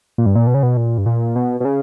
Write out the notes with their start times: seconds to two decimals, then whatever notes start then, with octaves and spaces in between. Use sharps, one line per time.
0.18 A#2
0.26 G2
0.35 A#2
0.47 B2
0.54 C#3
0.63 B2
0.77 A#2
0.98 G2
1.06 A#2
1.36 B2
1.60 B2
1.65 C#3